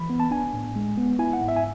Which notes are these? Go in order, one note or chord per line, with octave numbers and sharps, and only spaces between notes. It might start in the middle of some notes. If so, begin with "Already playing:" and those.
Already playing: E3 B5
B3
A5
D4 G#5
A2
G#3
B3
E4 G#5
F#5
G#2
E5
G#5